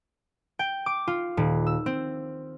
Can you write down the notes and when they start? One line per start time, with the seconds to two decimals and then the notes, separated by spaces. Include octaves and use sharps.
0.59 G5
0.86 D6
1.08 F4
1.37 D#1
1.67 E6
1.86 C4